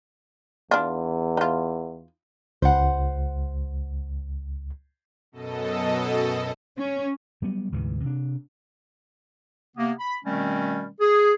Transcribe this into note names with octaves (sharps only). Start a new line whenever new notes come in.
E2 D4 F4
D#4 F4
C#2 C5 F#5
F#2 B2 A4 D#5
C#4
F#3 G3 B3
D2 G#2 C3 E3
C3 D4
C3 A#3 B3
B5
B2 D#3 G3 A3 C4 C#4
G#4